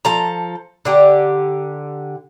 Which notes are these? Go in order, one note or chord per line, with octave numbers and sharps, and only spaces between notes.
F3 A4 A#5
D3 G4 A#5